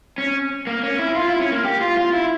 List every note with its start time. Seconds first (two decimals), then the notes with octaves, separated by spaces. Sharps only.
0.18 C#4
0.67 A#3
0.83 C#4
0.99 E4
1.15 F4
1.28 E4
1.40 C#4
1.52 A#3
1.65 G4
1.81 F4
1.97 F4
2.13 E4